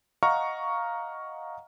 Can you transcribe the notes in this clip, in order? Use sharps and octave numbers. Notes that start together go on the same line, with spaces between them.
D#5 F5 F#5 A#5 C#6 F6